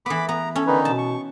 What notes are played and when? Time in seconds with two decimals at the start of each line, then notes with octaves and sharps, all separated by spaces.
0.06 E3 B3 B5 D6
0.29 B3 A#5
0.56 C#4 A4
0.67 D3 D#3 D#4 B4
0.85 B2 A5
0.98 C#6